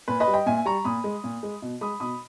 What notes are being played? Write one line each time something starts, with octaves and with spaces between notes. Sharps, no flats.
A#2 B4
B4 D#5
G3
D#5 G5
A#2 E5 G#5
G3 A#5 C#6
A#2 B5 D#6
G#3
A#2
G#3
B2
G#3 B5 D#6
B2 B5 D#6